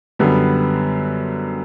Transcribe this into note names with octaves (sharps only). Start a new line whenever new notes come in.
F#2 D3 G3 B3